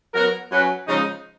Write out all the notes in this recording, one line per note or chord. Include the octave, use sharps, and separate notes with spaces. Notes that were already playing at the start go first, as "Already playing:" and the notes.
F#3 B3 F#4 A#4
F#3 C#4 F#4 B4
C#3 F3 G#3 D#4